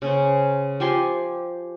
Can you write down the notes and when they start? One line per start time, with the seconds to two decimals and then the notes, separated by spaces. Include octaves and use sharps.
0.02 C#3 C#4 C5
0.80 F3 G4 G#5 C6